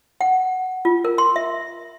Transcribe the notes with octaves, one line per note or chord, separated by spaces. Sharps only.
F#5
F4
A#4
C6
E5